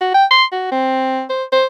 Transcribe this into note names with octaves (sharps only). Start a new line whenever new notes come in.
F#4
G5
C6
F#4
C4
C5
C5